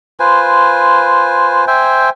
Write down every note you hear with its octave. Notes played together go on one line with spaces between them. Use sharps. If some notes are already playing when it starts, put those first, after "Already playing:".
F4 B4 C5 G#5
C5 E5 G5 G#5